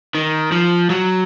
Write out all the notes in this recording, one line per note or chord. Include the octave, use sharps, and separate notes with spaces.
D#3
F3
F#3